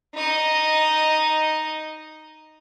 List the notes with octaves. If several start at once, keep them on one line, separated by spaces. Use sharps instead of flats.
D#4 D#5